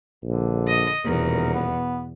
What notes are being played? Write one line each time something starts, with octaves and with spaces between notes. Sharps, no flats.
A#1 D3
D#5
D#1 E2 B2 A#4
B3